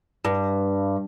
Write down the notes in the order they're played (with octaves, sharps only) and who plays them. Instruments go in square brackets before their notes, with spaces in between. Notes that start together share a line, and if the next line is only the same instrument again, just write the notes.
[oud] G2